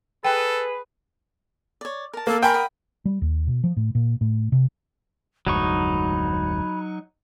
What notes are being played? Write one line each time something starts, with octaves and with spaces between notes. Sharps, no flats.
G#4 A4 B4 G5
C#5 D5
A#4 A5
A#3 A4
A#4 C5 G5 G#5 B5
D#5 F#5 B5
G3
D#2
B2
F3
A2
A#2
A2
C3
F1 D2 G#2 F#3 D#4 B5 C#6